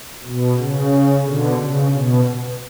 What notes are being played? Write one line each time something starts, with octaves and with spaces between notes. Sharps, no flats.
B2
C#3
B2 D3
C#3
B2